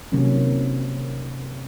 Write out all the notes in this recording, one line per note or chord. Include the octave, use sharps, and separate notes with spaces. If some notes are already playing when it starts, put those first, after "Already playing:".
C3 D#3 F#3 A#3 C#4